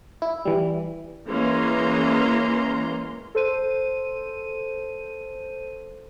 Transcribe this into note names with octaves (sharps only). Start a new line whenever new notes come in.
E4
E3 G3
E3 G#3 A#3 C#4 A#5 C6
A4 C5 D#7